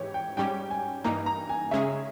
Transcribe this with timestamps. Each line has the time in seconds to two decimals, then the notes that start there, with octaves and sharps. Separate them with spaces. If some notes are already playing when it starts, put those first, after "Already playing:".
Already playing: G#2 E3 G4 C#5
0.14 G5
0.37 G#2 G3 C#4 G4 G5
0.70 G#5
1.04 G2 E3 A#3 D#4 A#5
1.26 A#5
1.49 G#5
1.71 C#3 G#3 C#4 G#4 E5